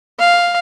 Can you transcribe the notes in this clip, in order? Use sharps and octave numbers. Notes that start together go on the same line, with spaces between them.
F5